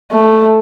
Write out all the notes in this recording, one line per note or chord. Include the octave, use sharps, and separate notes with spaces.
A3